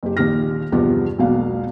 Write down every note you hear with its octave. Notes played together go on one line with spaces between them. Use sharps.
F#1 G4
A#1 D#2 D#3 G4 F6 A#6
E2 G2 C3 F3 G3 B3
E1 B1 B2 A#3 F5